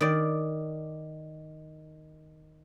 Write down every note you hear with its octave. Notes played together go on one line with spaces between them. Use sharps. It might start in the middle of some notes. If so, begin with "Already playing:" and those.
D#3 D5